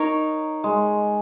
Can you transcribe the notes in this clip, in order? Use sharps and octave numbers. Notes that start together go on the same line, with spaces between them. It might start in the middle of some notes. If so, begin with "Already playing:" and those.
Already playing: D#4 A#4 C#5
G#3